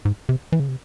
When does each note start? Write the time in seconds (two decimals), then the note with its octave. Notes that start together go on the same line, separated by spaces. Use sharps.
0.05 G#2
0.29 C3
0.52 E3
0.60 C#3
0.68 C3